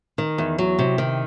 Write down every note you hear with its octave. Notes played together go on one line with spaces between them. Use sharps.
D#3
E2
F#3
C3
D#3